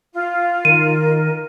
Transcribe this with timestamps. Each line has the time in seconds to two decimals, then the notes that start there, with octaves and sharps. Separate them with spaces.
0.14 F4
0.65 D#3 A#4 D#7